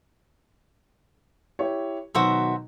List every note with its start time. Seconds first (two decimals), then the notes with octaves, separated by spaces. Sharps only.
1.59 E4 G4 C#5
2.15 B2 D#3 F#3 F#4 C5 E5